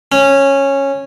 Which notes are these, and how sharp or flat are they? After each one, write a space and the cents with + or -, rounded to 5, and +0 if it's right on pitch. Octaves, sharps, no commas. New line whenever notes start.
C#4 -10